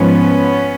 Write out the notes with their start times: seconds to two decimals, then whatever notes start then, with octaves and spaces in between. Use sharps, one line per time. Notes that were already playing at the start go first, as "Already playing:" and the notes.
Already playing: G#2 F3 B3 C#4